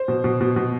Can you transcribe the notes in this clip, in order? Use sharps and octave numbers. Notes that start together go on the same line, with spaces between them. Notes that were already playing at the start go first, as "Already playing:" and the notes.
Already playing: C5
B2
B2
B2
B2